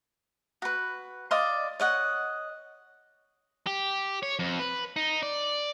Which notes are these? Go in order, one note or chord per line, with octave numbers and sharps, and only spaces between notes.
F#4 B4
D5 D#5 F5 C6
C#5 D#5 F#5
G4
C#5
F2
B4
D#4
D5